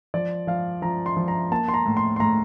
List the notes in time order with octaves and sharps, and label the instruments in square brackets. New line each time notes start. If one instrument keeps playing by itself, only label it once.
[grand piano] F3 D5
F3 F5
F3 A#5
C6
F3
A#5
A#3 A5
C6
A#5
A2
C6
C6
A2 A#5